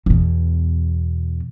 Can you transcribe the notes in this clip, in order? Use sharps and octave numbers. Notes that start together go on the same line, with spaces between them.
E2 B2